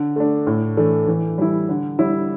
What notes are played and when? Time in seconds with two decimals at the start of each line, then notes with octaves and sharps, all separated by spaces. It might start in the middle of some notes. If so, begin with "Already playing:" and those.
Already playing: D3
0.16 A3 D4
0.47 A2
0.77 E3 A3 D4
1.08 E3
1.38 G3 E4
1.69 D3
1.99 G3 E4